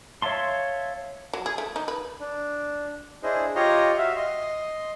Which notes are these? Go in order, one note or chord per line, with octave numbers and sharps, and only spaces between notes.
C#5 E5 F5 A5 C6
F#3
G#4
A3
D#4
B4
D4
D4 E4 G#4 C5 D#5
F4 G4 C#5 D#5 A#5 C6
F#4 E5 F5
D#5 C6